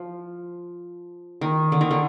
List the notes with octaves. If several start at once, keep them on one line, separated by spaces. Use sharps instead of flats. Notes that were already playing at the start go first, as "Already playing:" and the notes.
Already playing: F3
D#3
D3
D#3
D3